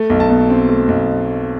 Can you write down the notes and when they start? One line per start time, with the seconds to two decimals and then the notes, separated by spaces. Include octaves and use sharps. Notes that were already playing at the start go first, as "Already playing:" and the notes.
Already playing: A3
0.10 B1
0.20 A5
0.30 B2
0.50 C4
0.69 A3
0.88 B1